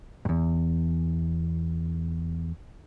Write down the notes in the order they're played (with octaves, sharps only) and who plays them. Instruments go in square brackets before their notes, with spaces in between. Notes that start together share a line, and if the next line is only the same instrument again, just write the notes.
[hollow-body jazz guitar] E2 G2